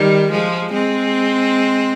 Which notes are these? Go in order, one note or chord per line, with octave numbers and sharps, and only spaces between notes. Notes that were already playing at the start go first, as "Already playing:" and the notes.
Already playing: D#3 G3
F3 G#3
G#3 C4